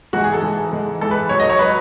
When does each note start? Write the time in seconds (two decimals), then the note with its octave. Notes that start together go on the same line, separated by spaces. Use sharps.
0.13 G#2 E3 G#3 F#4
0.24 G#4
0.33 A4
0.42 G#2 E3 G#3
0.72 G#2 E3 G#3
1.01 G#2 E3 G#3 A4
1.11 B4
1.29 G#2 F#3 C#5
1.40 D#5
1.50 C#5
1.59 F#3 B4